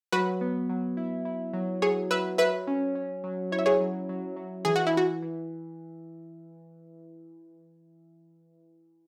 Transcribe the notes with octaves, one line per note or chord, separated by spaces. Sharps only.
F#3 F#4 B4
B3
F#3
E4
E4
F#3
F#3 G#4 C#5
F#3 B4 E5
F#3 B4 E5
C#4
C#4
F#3
E4 C#5
E5
G#4 C#5
F#3
F#3
F#3
E3 G#4
F#4
E4
E3 F#4
E3